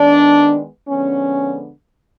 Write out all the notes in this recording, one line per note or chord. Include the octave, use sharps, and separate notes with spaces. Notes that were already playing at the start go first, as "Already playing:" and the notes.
Already playing: D#3 G#3 B3 D4
D3 F3 G#3 B3 C#4